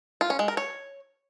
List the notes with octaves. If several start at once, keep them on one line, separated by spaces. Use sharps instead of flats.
F4
C#4
G#3
A#4
C#5